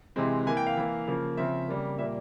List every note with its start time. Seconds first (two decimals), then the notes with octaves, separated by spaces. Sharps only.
0.16 C3 E3 G#3 C4
0.47 E3 A#3 G#5
0.57 G5
0.67 F5
0.77 E3 A#3
1.07 C#3 F3 A#3
1.37 C#3 F3 C4 E5
1.69 C#3 G3 A#3
1.98 A#2 E5
2.01 G3 A#3